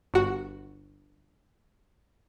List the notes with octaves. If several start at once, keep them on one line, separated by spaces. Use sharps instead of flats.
G1 F#4